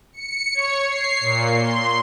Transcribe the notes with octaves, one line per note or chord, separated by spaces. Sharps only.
C#7
C#5
C7
A#2
C6